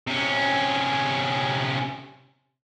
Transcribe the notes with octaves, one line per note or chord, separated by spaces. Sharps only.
C3 C#4